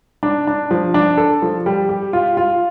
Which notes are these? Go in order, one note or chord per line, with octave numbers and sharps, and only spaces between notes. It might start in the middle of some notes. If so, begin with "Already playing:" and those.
D4
D4
F3
D4
A4
F3
G3
G4
F4
F4